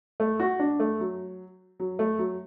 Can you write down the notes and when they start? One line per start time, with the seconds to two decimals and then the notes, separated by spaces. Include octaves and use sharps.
0.20 A3
0.40 F#4
0.59 D4
0.80 A3
1.00 F#3
1.80 F#3
1.99 A3
2.19 F#3